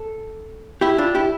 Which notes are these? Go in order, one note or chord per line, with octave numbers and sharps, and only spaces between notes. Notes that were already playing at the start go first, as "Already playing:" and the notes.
Already playing: A4
E4 G4
D4 F4
E4 G4